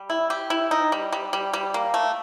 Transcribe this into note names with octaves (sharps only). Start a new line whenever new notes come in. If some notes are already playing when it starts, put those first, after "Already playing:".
Already playing: G3
E4
G4
E4
D#4
G3
G3
G3
G3
A#3
A3